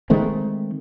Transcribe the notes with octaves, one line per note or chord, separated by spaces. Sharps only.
D#3 G#3 A3 C4